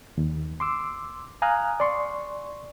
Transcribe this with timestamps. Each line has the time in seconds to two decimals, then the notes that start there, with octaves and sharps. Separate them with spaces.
0.18 D#2
0.60 C6 D6 E6
1.42 F5 G#5 A#5 D#6 F6 F#6
1.80 D5 C6 C#6